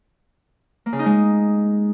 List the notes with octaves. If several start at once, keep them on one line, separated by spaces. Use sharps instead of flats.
A#3
C#3
D#4
G#3